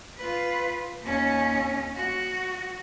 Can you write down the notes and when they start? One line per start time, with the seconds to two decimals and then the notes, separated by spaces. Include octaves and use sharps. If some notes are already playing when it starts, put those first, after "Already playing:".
0.17 F4 B4
1.02 D#2 C#4
1.95 F#4